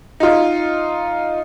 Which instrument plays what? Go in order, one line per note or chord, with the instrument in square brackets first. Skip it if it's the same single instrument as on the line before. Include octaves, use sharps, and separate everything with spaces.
[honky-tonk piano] D#4 F4